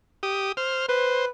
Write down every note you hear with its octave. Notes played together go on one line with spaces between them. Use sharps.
G4 D#6
C5 F6
B4 C5